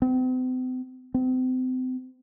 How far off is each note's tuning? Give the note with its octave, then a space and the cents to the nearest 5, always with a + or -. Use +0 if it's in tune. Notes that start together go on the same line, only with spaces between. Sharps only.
C4 -45
C4 -35